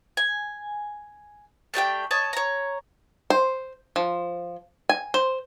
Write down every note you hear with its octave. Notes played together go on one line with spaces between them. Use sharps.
G#5
A3 D4 G4 G5
C#5 D#5 A5
C#5 A#5
C5
F3
G#5
C5